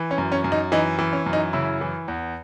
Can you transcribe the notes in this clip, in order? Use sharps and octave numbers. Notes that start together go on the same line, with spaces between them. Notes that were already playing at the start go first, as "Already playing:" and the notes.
Already playing: E3
C#4
F#2
C#4
F#2
D#4
E3 D#4
E3
C#4
F#2
D#4
C#3 E4
E3
E2